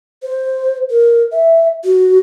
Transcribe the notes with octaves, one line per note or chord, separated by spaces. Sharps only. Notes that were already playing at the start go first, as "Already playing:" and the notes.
C5
A#4
E5
F#4